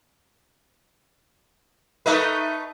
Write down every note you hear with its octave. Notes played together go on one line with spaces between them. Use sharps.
A3 D#4 B4